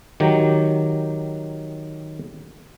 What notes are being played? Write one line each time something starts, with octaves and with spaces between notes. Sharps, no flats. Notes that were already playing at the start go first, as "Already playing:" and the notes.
D#3 F#3 G4